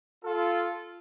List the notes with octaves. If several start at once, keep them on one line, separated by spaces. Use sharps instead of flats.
F4 A4